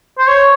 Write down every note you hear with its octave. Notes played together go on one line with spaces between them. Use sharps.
C5
C#5